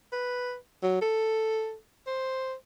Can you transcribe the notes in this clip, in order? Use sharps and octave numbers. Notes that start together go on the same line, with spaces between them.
B4
F#3
A4
C5